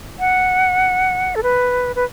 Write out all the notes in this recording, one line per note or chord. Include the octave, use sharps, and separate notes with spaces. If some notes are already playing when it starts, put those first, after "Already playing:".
F#5
A4
B4
B4